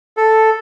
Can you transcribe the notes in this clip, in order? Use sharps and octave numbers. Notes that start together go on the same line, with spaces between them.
A4